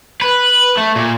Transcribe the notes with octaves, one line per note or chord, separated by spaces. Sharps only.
B4
A3
A#2